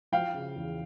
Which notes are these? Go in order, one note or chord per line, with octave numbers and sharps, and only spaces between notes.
F3 F5 G5
C#3
E2